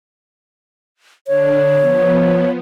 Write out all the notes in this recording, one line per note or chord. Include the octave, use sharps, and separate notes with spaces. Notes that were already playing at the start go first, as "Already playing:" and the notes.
D3 D4 C#5
F3 B3